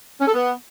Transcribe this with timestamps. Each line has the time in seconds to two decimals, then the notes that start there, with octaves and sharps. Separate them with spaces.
0.21 C#4
0.28 A4
0.34 B3